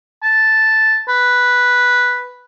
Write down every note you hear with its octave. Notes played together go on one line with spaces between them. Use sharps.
A5
B4